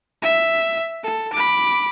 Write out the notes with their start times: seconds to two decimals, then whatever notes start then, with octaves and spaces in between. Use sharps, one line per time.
0.22 E5
1.04 A4
1.32 B5 D6